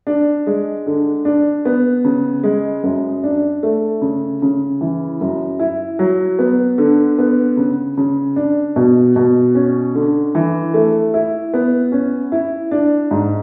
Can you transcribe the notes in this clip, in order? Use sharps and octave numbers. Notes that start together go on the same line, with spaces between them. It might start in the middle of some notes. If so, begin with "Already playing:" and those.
D4
G#3
D3
D4
B3
C#3
G#3
F#2
D4
A3
C#3
C#3
E3
F#2
E4
F#3
B3
D3
B3
C#3
C#3
D4
B2
B2
C#4
D3
E3
A3
E4
B3
C#4
E4
D4
G#2